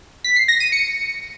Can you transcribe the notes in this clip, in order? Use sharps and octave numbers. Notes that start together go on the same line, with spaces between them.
B6
C7
A#6
D#7
C#7